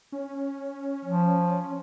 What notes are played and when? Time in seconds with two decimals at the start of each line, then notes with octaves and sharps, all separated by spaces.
0.12 C#4
1.05 F3